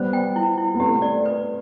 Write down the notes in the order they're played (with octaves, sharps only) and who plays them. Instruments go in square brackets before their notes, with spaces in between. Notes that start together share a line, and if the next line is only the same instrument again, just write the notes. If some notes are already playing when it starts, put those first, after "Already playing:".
Already playing: [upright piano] G3 B3 [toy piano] C5
[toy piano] G5
E4
E4
[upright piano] B3
[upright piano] A3 C4 [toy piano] G4
[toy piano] D5
B4